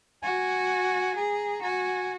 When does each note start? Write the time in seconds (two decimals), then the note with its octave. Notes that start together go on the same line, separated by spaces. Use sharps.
0.22 F#4 G#5
1.16 G#4 A#5
1.62 F#4 G#5